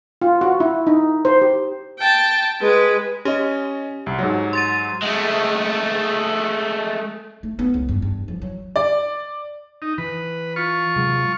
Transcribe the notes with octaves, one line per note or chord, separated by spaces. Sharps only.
F4
F#4
E4
D#4
C5
G4
G5 A5
G#3 B4
C#4 G4 D#5
C2
G#2 F#3
C6 A6 D#7
G#3 A3
A3
B3
C#2
G2
G2
F3
F#3
D5
D#4
E3 B4
F4 C#6
C3 F#3 G#3